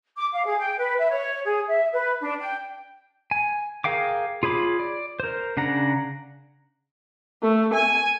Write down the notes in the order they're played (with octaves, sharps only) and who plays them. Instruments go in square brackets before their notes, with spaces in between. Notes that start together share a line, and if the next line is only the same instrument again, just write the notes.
[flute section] D6
F5
G#4
G5
B4
E5
C#5
G#4
E5
B4
D4
G5
[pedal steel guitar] G#5
G#4 A#4 F5 G5 D6
F4 G#4 C#5 B5 D6
D5
A#4 C5
C#3 D4 F#5 A#5
[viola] A3
G#5